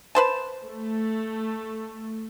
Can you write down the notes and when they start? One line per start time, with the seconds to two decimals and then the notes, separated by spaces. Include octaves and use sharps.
0.15 B4 C5 A5
0.66 A3